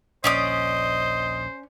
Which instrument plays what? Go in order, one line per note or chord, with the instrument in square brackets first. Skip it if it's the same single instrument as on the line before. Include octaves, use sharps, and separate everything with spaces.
[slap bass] A#1 D#2 A#2 [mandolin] C#4 D5 D#6 [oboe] C5 [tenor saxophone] D#5